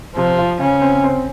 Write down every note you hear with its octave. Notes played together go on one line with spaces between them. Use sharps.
C3 F3
F4
C#3 C#4
C4
C4